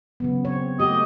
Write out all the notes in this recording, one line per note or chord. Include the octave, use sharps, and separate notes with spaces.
C#3 F#3 B3
C4 C#5
A3 F#4 G4 D#5